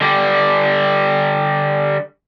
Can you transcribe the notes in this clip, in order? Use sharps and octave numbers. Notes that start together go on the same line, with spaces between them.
D3 G3